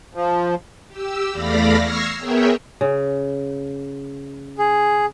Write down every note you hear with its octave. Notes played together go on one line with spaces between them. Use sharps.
F3
G4 E6
E2 A3 D5 F5 B5 A#6
C#6 E6 F6 G#6 A#6 C7
B3 G#4 A#4 C#5 E5 G5
C#3
G#4